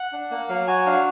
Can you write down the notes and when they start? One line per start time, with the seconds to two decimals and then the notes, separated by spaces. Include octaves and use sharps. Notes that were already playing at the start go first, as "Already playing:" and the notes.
Already playing: F#5
0.12 D4
0.31 A#3
0.49 F#3 F5
0.67 F#4 G#5
0.86 D4 F5